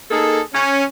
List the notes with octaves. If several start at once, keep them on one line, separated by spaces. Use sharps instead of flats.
A#3 D#4 G#4 A4
C#4